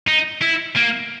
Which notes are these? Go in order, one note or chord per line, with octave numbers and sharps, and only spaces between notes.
D#4
E4
A#3